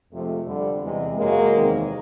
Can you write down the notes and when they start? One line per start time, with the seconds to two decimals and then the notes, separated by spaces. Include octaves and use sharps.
0.11 F2 C3 F3 G#3 A3
0.46 F2 D3 G3
0.82 E2 C3 E3 G#3
1.17 F#2 C#3 F#3 G#3 A#3
1.52 E2 C3 D#3